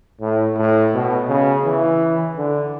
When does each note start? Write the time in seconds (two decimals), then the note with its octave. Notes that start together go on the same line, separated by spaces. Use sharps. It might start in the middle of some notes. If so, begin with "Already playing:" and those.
0.21 A2
0.58 A2
0.94 B2
1.29 C#3
1.65 E3
2.37 D3